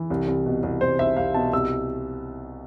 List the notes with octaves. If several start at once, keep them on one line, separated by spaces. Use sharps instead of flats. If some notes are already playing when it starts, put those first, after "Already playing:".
Already playing: E3
C2
C2
B2
C2
C2 C5
C2 E5
C2 F5
B2 A5
C2 E6